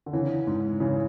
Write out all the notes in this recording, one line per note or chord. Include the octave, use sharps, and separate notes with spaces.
D3
C#3 E3
G#2
C#3 E3